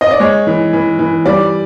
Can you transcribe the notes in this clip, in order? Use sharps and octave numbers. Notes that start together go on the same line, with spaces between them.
D#5
D5
G#3 C#5
E3
E3
E3
G3 D5